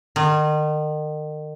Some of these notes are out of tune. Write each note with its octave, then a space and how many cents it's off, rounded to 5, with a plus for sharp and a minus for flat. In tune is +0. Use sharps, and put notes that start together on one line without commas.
D#3 -35